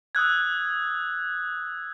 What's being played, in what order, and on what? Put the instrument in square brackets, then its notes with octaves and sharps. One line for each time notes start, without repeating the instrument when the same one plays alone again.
[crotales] D#6 E6 F#6 G#6